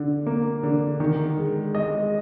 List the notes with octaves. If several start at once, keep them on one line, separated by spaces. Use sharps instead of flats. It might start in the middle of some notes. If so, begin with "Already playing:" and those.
Already playing: D3
A#3
D3
D#3
G#3
G#3 D#5